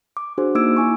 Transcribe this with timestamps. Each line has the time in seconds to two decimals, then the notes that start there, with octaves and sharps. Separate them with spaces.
0.17 D6
0.38 D4 F#4 G#4 C5
0.55 A#3 D#4 D6 E6 G#6 D7
0.77 E4 G#5 C#6